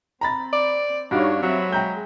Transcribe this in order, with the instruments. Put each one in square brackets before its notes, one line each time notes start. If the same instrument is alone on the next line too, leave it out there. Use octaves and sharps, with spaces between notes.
[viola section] C4 [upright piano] A#5 B5 A6
[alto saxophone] D5
[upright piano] G2 F#4 F5 [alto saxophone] D4 [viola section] D#4 C#5
[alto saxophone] F#3 [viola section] C4 E5 B5
[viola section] G#3 [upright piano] G5 A#5 G6